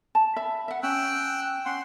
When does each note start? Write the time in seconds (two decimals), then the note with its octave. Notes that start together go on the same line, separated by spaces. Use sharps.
0.15 A5
0.36 E5 B5
0.68 E5 F#5
0.83 C#4 G5 E6 F#6
1.66 C#4 F#5 C6